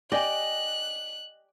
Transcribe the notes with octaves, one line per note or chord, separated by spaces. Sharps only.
G4 D5 D#5 G5 G#5 F#6